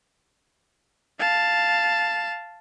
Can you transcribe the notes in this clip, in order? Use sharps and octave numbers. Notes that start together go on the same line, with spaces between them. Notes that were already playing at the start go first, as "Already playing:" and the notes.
F5 A5